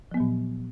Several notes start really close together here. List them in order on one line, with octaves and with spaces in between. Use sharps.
F3 B3 F#3 A#2